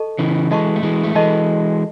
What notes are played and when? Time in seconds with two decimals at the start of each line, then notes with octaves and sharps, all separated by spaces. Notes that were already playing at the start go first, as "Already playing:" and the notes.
Already playing: A4 D#5 A5 C#6
0.19 C#3 E3
0.51 E3 G#3 A4 D#5 A5 C#6
0.76 A3
0.83 E3 G#3
1.04 A3
1.15 E3 G#3 A4 D#5 A5 C#6